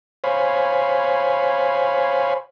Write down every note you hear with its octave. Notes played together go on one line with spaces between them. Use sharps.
C5 C#5 F5 G#5 B5